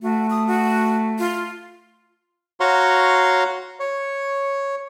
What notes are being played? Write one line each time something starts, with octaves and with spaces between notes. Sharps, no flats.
A3 F#4
D#6
F#4
F4
F#4 C#5 F5 A#5 C6
C#5